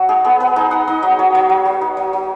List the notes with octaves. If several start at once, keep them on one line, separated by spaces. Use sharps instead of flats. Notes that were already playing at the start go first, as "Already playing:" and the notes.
Already playing: F#3 F#4
D#4 G#4
B3 G#4
B3 B4
D#4 G#4
D#4 F#5
D#4 D#5
F#3 D#5
F#3 C#5
F#3 C#5
F#3
F#3
D#4
F#3
F#3